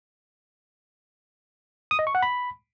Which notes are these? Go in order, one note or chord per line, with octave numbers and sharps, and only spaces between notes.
D#6
D#5
C#6
F#5
B5